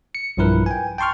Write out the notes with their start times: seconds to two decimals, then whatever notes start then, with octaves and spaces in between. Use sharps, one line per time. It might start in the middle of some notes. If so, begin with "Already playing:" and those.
0.15 C#7
0.37 B1 G2 F3 E4 A#4 B4
0.66 G5 G#5
0.98 G5 A5 C6 C#6 F6